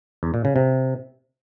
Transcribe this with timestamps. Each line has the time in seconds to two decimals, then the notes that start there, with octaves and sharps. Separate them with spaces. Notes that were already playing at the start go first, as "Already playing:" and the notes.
0.23 E2
0.34 A#2
0.45 C#3
0.56 C3